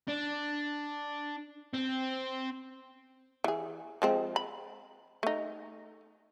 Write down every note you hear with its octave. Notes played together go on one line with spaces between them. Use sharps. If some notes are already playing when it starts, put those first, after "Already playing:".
D4
C4
E3 G#4
F3 G#3 C4
B5
A3 D#4